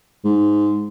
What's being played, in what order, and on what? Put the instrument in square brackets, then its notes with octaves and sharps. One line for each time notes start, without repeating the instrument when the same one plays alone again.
[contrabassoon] G#2